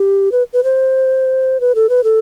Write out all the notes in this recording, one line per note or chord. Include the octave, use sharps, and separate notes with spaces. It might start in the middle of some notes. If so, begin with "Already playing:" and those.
Already playing: G4
B4
B4
C5
B4
A4
B4
A4